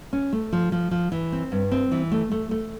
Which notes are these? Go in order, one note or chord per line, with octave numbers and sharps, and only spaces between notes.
C#4
A3
F3
F3
F3
E3
C4
G2
C4
E3
A3
A3
A3